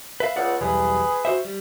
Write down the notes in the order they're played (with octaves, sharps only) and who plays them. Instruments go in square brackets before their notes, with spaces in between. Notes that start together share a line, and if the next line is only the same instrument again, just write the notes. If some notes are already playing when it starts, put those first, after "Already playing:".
[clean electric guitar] B4 E5 F5
[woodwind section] C#2 [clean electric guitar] D5 F#5
[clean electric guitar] B1 E2 G3 [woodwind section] G#4 B4
[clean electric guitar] F#4 C5 E5
G3